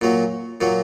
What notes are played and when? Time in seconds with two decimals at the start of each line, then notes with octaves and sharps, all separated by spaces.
0.01 A#2 F#3 A#3
0.61 A#2 F#3 A#3